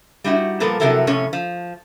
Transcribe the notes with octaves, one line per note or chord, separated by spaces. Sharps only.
G3 D#4 E4 F#4
A#2 F3 G3 B3 A4 A#4
C3 F3 F#3 E4 A4 A#4
F2 A2 C3 C#4 C#5
F3